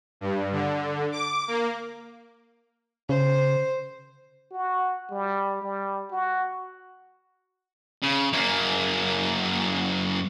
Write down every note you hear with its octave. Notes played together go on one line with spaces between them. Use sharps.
G2
D3
D6
A#3
C#3 C5
F#4
G3
G3
F#4
C#3
F#2 A#3